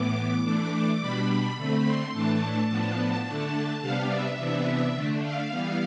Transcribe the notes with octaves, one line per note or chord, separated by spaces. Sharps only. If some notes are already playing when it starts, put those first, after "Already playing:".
Already playing: A2 E3 B3 D6
E3 A3 D4
B2 G3 D4 B5
D3 A3 C4 B5
C6
A2 E3 A3 D4 A5
A2 F3 B3 D4
D3 A3 D4
C3 G3 B3 D4 F5
E5
C3 E3 B3 D4
D3 A3 D4
F5
E3 G3 B3